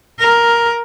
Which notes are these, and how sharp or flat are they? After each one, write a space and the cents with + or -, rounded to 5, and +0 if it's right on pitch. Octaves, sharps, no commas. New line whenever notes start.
A#4 +5